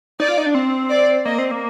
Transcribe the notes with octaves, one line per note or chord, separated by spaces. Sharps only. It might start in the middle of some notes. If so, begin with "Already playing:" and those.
D#4 D5
F4
D#4
D4
C4
D5
A#3 D#5
C4
A#3